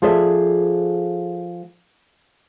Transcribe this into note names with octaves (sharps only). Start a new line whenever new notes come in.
F3 G#4 A4 D5 E5